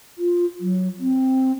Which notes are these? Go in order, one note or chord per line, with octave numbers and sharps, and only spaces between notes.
F4
F#3
C4